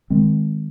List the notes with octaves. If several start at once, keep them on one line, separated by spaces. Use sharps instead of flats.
D#3 G#3 C4